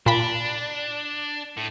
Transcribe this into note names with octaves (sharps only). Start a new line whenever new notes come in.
A#2 D4 B5
A2